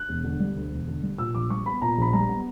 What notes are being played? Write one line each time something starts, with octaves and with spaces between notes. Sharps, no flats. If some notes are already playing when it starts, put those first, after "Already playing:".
Already playing: F#6
E1
D3
G3
D2
E1
D3
G3
A#2 E6
A#1 D6
G3 C#6
B3 B5
A#2 A#5
A#1 B5
G3 A#5
B3